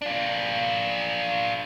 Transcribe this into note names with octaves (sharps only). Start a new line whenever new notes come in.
D4 F4